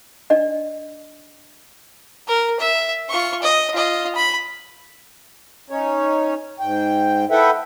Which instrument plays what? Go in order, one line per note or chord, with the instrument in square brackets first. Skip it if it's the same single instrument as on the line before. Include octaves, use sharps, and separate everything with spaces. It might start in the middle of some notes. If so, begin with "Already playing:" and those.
[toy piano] D4 D5 D#5
[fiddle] A#4
E5
F4 C#6
D#5
F4 D#5
B5
[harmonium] C#4 D#4 C#5
G#2 G5
E4 A4 B4 E5 F#5 G5